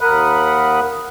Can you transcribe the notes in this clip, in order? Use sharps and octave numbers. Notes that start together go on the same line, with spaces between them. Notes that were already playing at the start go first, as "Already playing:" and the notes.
D#2 A#4 F#5 B5 D#6 F#6